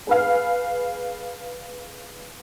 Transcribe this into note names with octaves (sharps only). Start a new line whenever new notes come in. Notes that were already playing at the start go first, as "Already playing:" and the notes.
G#4 B4 F5